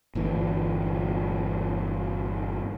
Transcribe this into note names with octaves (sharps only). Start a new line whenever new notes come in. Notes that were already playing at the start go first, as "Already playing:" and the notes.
G1 A#2 E3